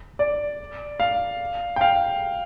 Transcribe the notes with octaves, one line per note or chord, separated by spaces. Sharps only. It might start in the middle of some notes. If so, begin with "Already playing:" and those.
D5
F5
G5
F5